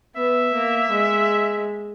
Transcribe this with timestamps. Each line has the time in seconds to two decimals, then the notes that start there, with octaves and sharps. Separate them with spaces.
0.15 B3 E5
0.53 A#3
0.91 G#3